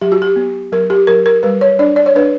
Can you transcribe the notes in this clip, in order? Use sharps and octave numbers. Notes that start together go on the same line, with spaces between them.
F#3 G4
F#4
G4
B3
F#3 A#4
G4
F#3 A#4
A#4
G3 B4
C#5
D4 D5
D5
C#5
D4 B4